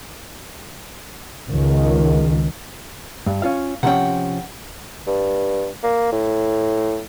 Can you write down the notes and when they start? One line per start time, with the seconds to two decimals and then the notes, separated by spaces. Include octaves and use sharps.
1.49 C#2 D#3
3.26 G2
3.42 C#4 F4 F5
3.83 C3 F3 C#4 F#5 G5
5.07 G2
5.84 A#3
6.12 A2